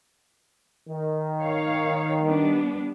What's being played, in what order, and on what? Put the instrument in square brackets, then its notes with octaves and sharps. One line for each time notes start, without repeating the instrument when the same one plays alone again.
[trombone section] D#3
[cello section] C#5 F5
G3 B3 D4